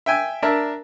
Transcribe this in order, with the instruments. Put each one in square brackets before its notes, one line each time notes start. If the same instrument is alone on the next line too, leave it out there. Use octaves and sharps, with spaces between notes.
[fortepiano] E5 G5 G#5
D4 A#4 E5 A5